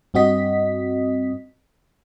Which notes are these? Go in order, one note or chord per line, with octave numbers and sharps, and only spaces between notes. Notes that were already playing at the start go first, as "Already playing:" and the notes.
G2 C4 F#4 D#5 B6